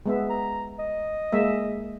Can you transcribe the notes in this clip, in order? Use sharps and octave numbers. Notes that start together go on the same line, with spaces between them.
G#3 B3 E5
A#5
D#5
G#3 A#3 E5